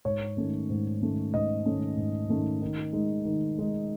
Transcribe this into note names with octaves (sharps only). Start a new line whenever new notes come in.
G#2 C#5
D#3 A3 C#4
G#2
D#3 A3 C#4
G#2 D#5
D#3 A3 C#4
G#2
D#3 A3 C#4
D#3
G#3 D#4
D#3
G#3 D#4